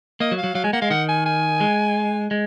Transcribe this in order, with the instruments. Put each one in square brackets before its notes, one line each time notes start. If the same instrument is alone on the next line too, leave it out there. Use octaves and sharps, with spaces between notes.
[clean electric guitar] A#3 [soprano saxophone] D#5
[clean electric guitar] F#3
[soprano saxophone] F5
[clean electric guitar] F#3
[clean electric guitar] F#3 [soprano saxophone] F5
[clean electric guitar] G#3 [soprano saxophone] G#5
[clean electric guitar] A#3 [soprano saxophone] F#5
[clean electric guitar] G#3 [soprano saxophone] F5
[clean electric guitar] D#3 [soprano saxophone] F#5
[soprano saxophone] G#5
G#5
[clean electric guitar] G#3
G#3